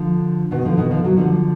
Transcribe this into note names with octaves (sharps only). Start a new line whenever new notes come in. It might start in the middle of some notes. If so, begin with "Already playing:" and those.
Already playing: D3 F3
B2 D#3
D3 F3
B2 D#3
D3 F3
D#3 F#3
D3 F3